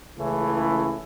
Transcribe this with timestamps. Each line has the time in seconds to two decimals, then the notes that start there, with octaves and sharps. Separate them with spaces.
0.16 C#2 C#3 E3 A3 E4